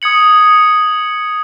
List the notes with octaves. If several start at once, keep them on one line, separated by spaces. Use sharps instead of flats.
D#6 G#6 C#7 F#7